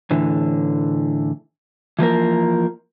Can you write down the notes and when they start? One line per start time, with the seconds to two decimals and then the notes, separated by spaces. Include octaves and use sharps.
0.11 A2 D3 E3
1.99 E3 F3 A#3 A#4